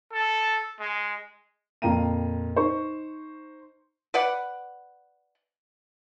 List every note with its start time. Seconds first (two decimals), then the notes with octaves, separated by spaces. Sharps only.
0.12 A4
0.80 G#3
1.82 F2 A#2 F5 G5 A#5 D#7
2.56 D#4 C5 C#6
4.14 B4 D5 F#5